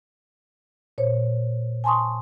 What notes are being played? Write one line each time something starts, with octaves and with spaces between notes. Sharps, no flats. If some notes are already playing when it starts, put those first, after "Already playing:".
A#2 C5 C#5
G#5 A5 C6 C#6 D#6